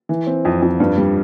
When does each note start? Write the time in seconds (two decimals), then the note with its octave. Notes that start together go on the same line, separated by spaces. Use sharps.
0.09 E3
0.27 C4
0.45 F2
0.62 F2
0.80 G2
0.97 G3